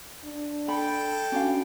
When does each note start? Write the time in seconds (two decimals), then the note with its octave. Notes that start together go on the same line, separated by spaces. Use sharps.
0.24 D4
0.68 A4 G5 B5
1.32 C#4 D4 F#4 F5